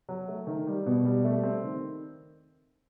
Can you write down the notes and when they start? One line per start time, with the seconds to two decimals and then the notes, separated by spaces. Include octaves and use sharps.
0.09 F#3
0.28 A3
0.47 D#3
0.67 G3
0.86 B2
1.05 G3
1.25 A3
1.43 C4
1.64 D#3